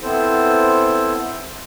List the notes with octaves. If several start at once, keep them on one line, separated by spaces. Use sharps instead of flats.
B3 C4 E4 A4 C5